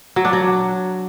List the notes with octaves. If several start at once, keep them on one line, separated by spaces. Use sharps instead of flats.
F#3
D4
F#3